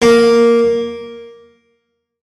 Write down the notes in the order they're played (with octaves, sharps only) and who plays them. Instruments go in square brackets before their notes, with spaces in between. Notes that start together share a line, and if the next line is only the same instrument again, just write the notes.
[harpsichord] A#3